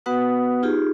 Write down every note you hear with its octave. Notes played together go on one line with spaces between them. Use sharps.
B3 F#4 B4 F#5 D#6
D#4 F4 G4 G#4